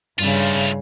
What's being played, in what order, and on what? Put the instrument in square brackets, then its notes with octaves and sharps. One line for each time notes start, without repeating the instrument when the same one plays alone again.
[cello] G2 C#3 [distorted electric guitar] A3 F4